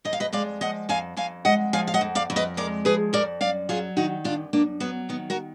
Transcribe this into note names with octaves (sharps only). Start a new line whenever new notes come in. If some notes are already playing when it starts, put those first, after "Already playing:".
F2 D#5
F5
B4 D#5
G#3 D5 F5
F3 D#5 F#5
F2 F5 G#5
F2 F5 G#5
G#3 D#5 F#5
F3 F5 G#5
F5
D#5 F#5
F2
D5 F5
F2
B4 D#5
G#3 A#4 D5
F3 G#4 B4
F2 A#4 D5
F#2 D5 F5
F#3 F4 G#4
D#3 D#4 F#4
F#2 D4 F4
F#2 A#3 D4
F#3 B3
D#3 B3
F#4 A#4